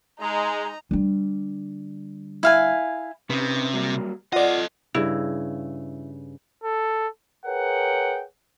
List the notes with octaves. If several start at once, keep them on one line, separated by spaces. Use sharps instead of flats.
G#3 D#4 A#5
D3 G3
E4 F5 G#5
C3 C#4 D#4 B4
F#3 G3 A#3
F4 A4 D5 D#5 F#5
G2 C#3 E4
A4
G#4 A#4 B4 C#5 F#5 G5